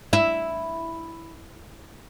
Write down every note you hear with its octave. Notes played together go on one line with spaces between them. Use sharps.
E4